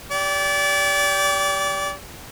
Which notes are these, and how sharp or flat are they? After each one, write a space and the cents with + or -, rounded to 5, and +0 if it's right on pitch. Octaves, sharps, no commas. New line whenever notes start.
G4 +0 D5 -30